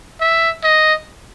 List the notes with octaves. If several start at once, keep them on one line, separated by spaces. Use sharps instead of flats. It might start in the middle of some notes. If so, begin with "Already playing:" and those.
E5
D#5